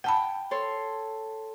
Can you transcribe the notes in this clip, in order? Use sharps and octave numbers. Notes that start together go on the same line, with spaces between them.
F#5 G5 A5 B5
A4 C#5 C6